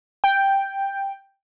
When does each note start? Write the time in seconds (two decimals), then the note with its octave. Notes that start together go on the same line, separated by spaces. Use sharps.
0.24 G5